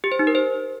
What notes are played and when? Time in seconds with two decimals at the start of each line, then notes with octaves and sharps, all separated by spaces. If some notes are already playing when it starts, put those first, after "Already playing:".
0.04 G4
0.12 C5
0.19 D#4
0.27 A#4
0.35 C5